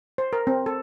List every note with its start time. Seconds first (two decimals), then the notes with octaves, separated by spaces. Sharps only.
0.18 C5
0.33 A#4
0.47 C4
0.66 A4